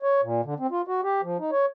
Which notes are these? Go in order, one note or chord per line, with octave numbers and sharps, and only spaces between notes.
C#5
A#2
D3
C4
F4
F#4
G4
F3
D#4
C#5